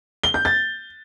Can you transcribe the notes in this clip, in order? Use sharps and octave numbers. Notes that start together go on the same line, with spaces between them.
G7
G6
A6